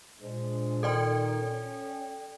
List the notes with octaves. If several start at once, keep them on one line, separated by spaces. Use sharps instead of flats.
A#2 G#3 D4 C5
D#3 A4 D5 G5
C#4